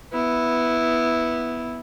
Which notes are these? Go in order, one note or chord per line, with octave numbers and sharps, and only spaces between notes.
B3 E4